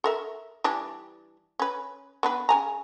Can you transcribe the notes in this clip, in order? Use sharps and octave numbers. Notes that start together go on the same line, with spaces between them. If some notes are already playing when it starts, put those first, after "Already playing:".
A4 A#4 E5
E3 G3 D4
C#4 B4
B3 D4 B4
C#3 G#5 A#5